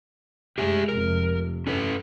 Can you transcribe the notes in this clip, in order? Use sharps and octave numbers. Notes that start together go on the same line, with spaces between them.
F#2 G#3 G4 E5 G#5
F1 C3 A#4
G2 C#4 A4 B4